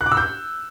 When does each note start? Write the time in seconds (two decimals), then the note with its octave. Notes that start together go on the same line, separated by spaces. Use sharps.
0.01 F#6
0.06 D6
0.12 E6
0.17 G6